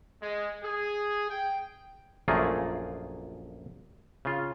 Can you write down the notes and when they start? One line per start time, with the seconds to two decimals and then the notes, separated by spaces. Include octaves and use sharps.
0.21 G#3
0.62 G#4
1.28 G5
2.28 A#1 F#2 A3 A#3 F4 G#4
4.25 C#3 F4